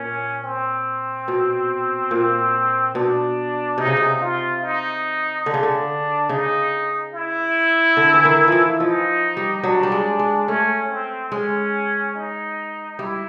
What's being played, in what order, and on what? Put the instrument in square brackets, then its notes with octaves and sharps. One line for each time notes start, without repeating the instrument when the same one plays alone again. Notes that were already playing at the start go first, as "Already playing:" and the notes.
Already playing: [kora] A#2 [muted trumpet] C#4
[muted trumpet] C4
[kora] B2
A#2
[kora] B2 [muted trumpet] D4
[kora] C3 [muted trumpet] D#4
[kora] C#3
C3
[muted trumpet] F4
D#4
[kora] D3 [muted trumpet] D4
[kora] C#3
D3
[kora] C#3 [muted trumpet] D#4
[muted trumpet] E4
[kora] D3
E3
D#3
E3 F3
[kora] F3 [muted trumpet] D#4
[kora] G3
[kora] F#3 [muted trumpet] D4
[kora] G3
G#3
G#3
[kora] A3 [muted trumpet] C#4
[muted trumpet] C4
[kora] G#3 [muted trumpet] C#4
[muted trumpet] D#4
[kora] G3 [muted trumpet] E4